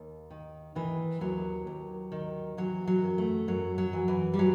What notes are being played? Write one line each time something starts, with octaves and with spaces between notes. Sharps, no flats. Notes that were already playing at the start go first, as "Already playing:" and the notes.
Already playing: D#2
D#3
D#3 E3
D#2 F#3
D#2
D#3
E3 F#3
F#3
F#2
A3
F#2 F#3
F#3
E3
E3
G3
E3 F#3